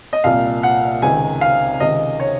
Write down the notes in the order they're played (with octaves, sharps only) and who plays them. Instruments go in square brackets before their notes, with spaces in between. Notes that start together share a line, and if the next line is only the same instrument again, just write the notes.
[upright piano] D#5
C2 A#2 F5
F#5
C#2 C3 D#3 G#5
F5
C#2 C3 D#3 D#5
C#5